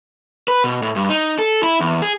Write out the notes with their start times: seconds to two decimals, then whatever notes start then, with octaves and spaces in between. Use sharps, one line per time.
0.48 B4
0.64 B2
0.82 A2
0.96 G2
1.09 D#4
1.39 A4
1.63 E4
1.81 E2
2.02 G#4